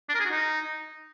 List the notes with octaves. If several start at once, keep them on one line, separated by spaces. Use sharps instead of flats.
D4
A#4
G#4
F#4
D#4